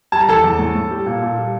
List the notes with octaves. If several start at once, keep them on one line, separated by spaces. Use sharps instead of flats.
G3 A5
A#5
E2 A4 A5
E2
A2
A2
G3
A#2
A#2
G3